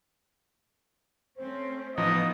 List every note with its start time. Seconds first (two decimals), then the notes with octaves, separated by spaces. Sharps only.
1.37 A3 C4 C#4 C5
1.97 A1 F3 B3 D#4 F4 D#5 D#6